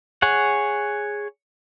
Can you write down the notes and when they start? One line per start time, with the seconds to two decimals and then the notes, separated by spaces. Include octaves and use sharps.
0.22 G#4 C#5 F#5